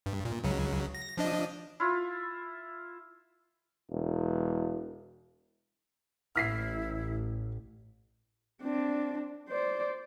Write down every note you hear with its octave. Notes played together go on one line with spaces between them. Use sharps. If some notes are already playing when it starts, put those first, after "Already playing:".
G2
A#2
C#2 C#3 F#3
A#6
F3 D4 D#5
E4 F4
E1
A1 E4 F6 B6 C7
C4 D4
C5 D5